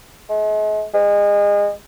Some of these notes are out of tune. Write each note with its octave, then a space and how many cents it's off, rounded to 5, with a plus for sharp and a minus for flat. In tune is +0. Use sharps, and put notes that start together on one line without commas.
G#3 +40
G#3 -30